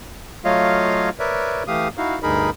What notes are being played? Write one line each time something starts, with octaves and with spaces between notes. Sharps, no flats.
F#3 A3 F4 C#5 D#5 F5
A#4 B4 C#5 D5 E5
E3 A3 G4 F5 D#6
D#4 E4 F#4 F5
D2 G2 D#4 G#4 A#4 B5